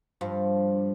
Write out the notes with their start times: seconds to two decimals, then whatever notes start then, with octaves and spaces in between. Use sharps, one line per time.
0.21 G2 F3